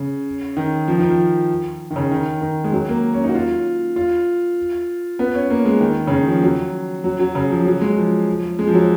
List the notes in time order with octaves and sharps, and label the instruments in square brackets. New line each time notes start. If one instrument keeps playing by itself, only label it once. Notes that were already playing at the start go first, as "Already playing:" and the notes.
Already playing: [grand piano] C#3
D#3
F3
D#3
F3
D#3
C#3
D#3
D#3
G#3
F#3
A#3
C#4
D#4
F#4
F4
F4
B3
C#4
A#3
G#3
D#3
C#3
D#3
F3
F#3
F#3
F#3
C#3
F3
F#3
G#3
F3
G#3
F3
F#3